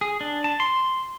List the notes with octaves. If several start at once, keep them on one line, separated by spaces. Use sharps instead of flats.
G#4
D4
A5
C6